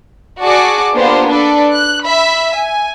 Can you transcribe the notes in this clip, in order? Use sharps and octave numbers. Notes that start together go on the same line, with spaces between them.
F#4 G#4 D5 A5 D6
A#3 B3 D4 F4 G4 C5
D4 A4 B4 D5
F#6
E5 B5
G#5